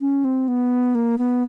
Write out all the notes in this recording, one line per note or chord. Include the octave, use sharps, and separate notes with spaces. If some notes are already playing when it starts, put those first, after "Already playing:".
C#4
C4
B3
A#3
B3